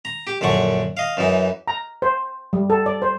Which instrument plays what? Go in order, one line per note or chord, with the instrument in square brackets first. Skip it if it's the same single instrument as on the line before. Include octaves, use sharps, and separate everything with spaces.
[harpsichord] A#5
G4
A#1 F#2 D3 F#5 C#6
D#5 F5
F#2 E3 D#4
[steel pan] A#5
C5
G3
A4
D5
C5